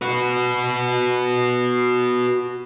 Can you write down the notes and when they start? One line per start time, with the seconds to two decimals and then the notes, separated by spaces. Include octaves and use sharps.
0.02 F#4 B4